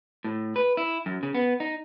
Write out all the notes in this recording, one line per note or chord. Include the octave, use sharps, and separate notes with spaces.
A2
B4
E4
F#2
C#3
B3
D#4